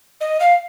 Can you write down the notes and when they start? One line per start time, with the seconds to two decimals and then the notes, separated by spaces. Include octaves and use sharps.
0.21 D#5
0.40 F5